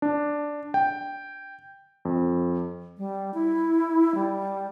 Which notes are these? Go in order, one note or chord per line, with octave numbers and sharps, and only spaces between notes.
D4
G5
F2
G3
E4
G3